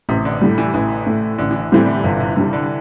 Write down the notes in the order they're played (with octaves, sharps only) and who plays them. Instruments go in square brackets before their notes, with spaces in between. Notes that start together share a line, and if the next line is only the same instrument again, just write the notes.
[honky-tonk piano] A1 [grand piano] C3
[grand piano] D3
[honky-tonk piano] A2 G3
[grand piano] E3
[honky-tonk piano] A1 [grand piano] E3
[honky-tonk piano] A2 A3
[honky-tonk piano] A1 [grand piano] D3
[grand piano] E3
D3
[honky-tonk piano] A2 G3 C4 E4 [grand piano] E3
[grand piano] D3
[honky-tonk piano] G1 [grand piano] C3
[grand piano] C3
[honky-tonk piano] G2 G3 [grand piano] C3
[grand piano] D3